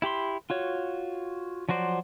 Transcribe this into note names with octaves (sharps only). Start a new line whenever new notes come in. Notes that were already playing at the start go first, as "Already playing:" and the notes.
E4 G4 B5 C6
F4 F#4 C#5
F3 F#3 F#4 C5 D5